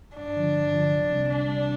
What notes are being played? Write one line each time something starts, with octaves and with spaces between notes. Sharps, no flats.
G2 D4
D3 F3
G2
D3 F3
C2
C3 G3
C2 D4
C3 G3